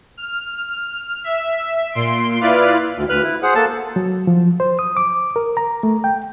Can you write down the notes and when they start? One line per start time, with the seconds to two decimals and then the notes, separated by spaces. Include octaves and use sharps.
0.17 F6
1.24 E5
1.92 A#2 C6 D7
2.41 E4 F4 B4 D5 F5
2.97 D2
3.09 D2 B4 F6 F#6
3.23 E4
3.43 G#4 C5 F#5
3.55 A#3 A4 A5
3.96 F#3
4.27 F3
4.60 C5
4.79 D#6
4.97 D6
5.36 A#4
5.57 A#5
5.83 A3
6.04 G5